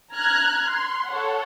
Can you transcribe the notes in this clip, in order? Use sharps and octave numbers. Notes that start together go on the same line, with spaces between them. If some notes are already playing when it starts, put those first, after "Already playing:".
A#5 F6 F#6 G#6
C6
A4 C#5 F#5